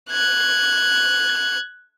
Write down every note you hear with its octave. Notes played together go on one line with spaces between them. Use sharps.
F#6 G#6